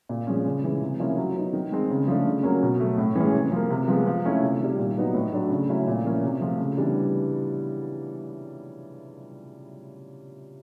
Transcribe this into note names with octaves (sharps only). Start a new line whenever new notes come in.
A#2
F3 G#3 C#4
C#3
E3 G#3
C3
F3 A#3 C#4 E4
F#3
B3 D#4
D#3
G#3 C4 D#4
C#3
F3 A3 D4
C#3
F#3 A#3 C#4
B2
F#3 A3
A2
E3 G#3 C#4
C3
F3 A#3
C3
F3 G#3 B3
F3
A3 C#4 E4
C3
D#3 G3
A#2
F#3 B3 D#4
A2
F#3 A3 D4
C#3
F#3 A3 C#4 E4
A#2
F3 A#3 C#4 E4
C3
F3 A3
C#3
E3 G3 B3 D4